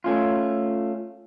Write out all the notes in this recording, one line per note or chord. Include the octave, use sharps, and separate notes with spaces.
A3 C#4 F4